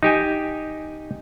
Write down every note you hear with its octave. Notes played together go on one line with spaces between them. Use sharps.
D#4 G4 G#5